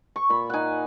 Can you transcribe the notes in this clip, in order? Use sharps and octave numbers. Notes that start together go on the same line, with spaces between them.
C#6
A#2 B5
D#4 F#5 G#5